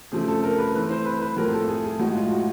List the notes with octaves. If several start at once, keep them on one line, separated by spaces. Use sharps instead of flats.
C#3 F3 A3 C4 G#4
A4
A#4
B4
E3 A3 C4 B4
C5
B4
B4
A2 F3 A3 C4 A#4
A4
G#4
G#4
A2 F3 G#3 F#4
F4
F#4